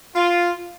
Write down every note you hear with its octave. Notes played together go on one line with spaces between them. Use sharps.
F4